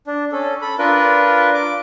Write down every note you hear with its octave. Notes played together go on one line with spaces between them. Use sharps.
D4
C#4 A4
A4 B5
D4 F4 A#4 B4
D6